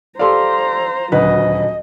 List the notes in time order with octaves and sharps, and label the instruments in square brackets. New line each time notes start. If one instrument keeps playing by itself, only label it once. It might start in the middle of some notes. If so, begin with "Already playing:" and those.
[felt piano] G4 A4 D5 [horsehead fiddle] C5 A#5 [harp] F5 C6
[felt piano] D#1 D2 B4 [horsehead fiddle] F#3 [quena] D#5